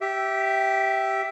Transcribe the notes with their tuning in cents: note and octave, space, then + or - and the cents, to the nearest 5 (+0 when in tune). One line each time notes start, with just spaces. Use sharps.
G4 -10 E5 +0